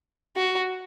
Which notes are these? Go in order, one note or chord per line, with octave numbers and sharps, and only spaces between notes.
F#4